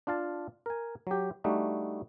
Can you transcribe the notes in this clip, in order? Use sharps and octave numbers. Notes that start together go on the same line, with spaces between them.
D4 F4 F5 A5
A#4 G#5
F#3 G4
G3 A3 D4 D#4 F#4